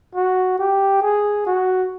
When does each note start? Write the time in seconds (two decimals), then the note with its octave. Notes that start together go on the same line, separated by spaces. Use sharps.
0.15 F#4
0.59 G4
1.02 G#4
1.46 F#4